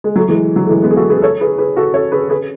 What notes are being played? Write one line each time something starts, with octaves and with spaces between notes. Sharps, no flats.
G#3
F#3 A3
E3 G#3
F#3
A3
E3 G#3
G#3 B3
G#4
F#4 A4
G#4 B4
A4 C#5
G#4 B4
G#4 B4
F#4 A4
A4 C#5
G#4 B4
G#4 B4